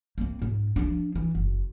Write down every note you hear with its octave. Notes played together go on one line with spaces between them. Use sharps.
A#3 C4
G#2
F3 D4
E3
F#1